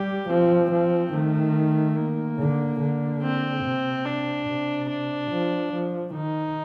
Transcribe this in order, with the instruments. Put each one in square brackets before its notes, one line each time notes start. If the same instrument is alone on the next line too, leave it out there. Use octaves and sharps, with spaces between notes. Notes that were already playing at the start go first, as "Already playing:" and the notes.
Already playing: [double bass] G3 [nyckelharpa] G4
[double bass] F3 [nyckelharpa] C4
[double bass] F3
[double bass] D#3 [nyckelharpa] A3
[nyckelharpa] A#3
[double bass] D3
D3
[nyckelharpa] C4
[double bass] C3
[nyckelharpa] D4
[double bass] C3
[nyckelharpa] D4
[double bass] F3
F3
[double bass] D#3 [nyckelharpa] D#4